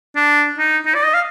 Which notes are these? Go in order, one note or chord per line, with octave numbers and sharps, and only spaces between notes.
D4
D#4
D#4
D5
D#5
F5